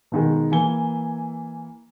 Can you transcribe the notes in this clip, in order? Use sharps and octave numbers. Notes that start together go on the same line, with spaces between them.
B2 D#3 G#3
E3 A#3 G#5 G7